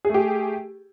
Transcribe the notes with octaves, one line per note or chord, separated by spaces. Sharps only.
A3 G4 G#4